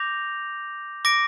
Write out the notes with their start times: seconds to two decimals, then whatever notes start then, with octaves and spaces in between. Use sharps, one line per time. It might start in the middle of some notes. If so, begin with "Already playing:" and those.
Already playing: D6 G6 A#6 F7
1.05 D6 A#6 D7